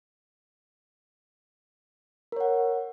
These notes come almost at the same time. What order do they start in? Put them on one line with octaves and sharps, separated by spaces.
A#4 C#5 F#5